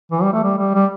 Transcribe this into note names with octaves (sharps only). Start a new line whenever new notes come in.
E3
G3
A3
G3
G3
G3